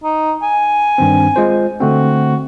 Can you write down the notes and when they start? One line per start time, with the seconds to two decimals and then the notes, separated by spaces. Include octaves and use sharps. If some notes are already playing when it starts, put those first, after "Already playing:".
0.04 D#4
0.43 G#5
0.98 G2 D#3 C4
1.36 G#3 F4 C5
1.81 D3 A3 C4 F#4